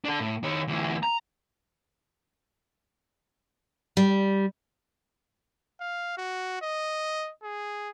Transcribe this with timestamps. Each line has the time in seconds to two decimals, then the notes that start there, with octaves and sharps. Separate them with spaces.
0.05 D4 A4
0.20 A2
0.43 D#3 C#5
0.67 D2 E3
1.03 A#5
3.97 G3
5.80 F5
6.18 F#4
6.62 D#5
7.43 G#4